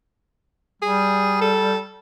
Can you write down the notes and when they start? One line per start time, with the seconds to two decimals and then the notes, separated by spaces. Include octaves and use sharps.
0.82 G3 G#4
1.41 A4